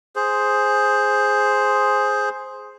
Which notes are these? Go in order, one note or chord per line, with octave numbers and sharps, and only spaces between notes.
G#4 C5